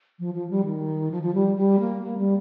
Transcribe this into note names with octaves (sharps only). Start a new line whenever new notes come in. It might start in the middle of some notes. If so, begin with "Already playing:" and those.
F3
F3
G3
D#3
F3
F3
G3
G3
A#3
A#3
G3